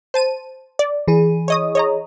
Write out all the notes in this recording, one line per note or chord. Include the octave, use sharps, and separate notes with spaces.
C5 A5 D#7
D5
E3 G#4
C#5 D#5 D#6
C#5 D#5 A#5